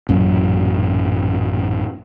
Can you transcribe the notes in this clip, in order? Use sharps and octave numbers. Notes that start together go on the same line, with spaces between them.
A1 F#2 A#2 F#3